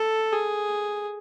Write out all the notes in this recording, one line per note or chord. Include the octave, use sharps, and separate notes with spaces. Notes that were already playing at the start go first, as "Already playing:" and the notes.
Already playing: A4
G#4